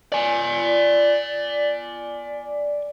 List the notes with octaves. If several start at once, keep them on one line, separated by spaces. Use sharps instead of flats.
D5 G#5